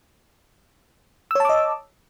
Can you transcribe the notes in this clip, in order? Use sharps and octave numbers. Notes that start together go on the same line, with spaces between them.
C#5 D#5 A5 D6 E6